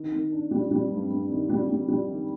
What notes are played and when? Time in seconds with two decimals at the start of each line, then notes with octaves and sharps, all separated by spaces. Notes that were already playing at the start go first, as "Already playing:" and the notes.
Already playing: D#3
0.12 D#3
0.32 D4
0.51 G3
0.71 G3
0.91 G2
1.10 G2
1.30 D#3
1.49 G3
1.69 G3
1.88 G3
2.08 D#3